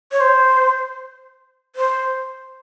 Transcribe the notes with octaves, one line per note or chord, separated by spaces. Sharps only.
C#5
C5
C5